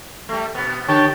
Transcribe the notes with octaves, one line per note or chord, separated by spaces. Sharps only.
G3 A3
B2 B3
D3 G4 C#5 G5 A5